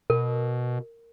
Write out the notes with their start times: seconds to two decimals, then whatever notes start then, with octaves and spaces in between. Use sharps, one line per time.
0.10 B2 A#4